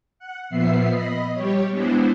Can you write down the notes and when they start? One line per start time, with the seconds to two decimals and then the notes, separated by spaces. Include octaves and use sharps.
0.19 F#5
0.50 A#2 F3 B3 E5 C7
0.88 D#5 B5
1.33 G3 G4 C#5
1.70 G#3 B3 D4 E4 C5